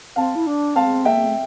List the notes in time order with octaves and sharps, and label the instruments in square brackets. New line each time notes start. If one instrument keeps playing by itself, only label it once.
[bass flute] C4 [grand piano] F5 A5
[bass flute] E4
D4
[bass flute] C4 [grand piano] F5 A5
[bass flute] A#3 [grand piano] E5 G5
[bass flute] A3